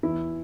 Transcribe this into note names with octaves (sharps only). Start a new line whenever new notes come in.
E2 E3 E4